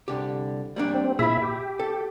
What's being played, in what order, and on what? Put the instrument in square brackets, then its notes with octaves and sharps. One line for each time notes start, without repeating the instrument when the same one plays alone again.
[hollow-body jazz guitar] C2 D3 G4
G3 A#3 D4
[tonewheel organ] C4
[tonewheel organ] A#2 E4 E5 [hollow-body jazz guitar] G#4 B5
[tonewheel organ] G4
[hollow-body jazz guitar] A4